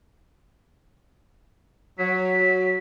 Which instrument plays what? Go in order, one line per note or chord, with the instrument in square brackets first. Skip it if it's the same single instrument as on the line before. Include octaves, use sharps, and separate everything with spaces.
[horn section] F#3 [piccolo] B6